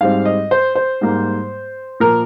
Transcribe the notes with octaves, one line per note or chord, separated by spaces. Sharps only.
G#2 G3 C4 F5
D#5
C5
C5
G#2 G3 A#3
A#2 F3 A#3 A#4